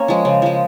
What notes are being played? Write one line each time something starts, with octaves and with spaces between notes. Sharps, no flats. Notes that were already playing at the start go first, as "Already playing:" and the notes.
Already playing: A#3 C#4 A#4 C#5
F3 G#3
C#3
F3 G#3